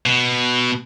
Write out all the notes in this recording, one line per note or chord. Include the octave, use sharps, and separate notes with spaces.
B2